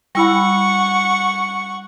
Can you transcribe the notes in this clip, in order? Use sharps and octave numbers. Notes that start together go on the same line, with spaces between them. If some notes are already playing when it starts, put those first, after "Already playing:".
G3 E4 F#5 B5 C#6